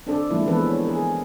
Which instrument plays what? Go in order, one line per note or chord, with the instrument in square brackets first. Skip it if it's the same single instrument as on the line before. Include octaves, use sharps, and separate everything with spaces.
[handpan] C4 D4 A4 D5
F3 G#3 A#3 E4
E3 G#3 B3 C4 A4 B4
C#5
G#4 A#4